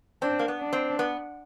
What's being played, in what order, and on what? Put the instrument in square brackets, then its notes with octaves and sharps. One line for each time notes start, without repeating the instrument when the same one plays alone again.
[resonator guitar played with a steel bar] C4 [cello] D4
[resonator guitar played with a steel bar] A#3
B3
[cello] D4
[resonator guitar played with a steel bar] C4
B3